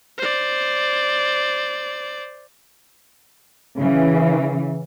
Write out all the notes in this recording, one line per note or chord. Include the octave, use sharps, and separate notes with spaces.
C5 D5
C#3 E3